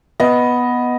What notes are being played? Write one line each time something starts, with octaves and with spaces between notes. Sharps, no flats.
B3 D#5